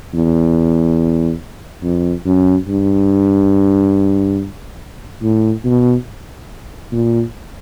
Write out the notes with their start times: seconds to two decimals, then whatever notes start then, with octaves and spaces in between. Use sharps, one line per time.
0.14 E2
1.83 F2
2.26 F#2
2.68 G2
5.23 A2
5.65 B2
6.92 A#2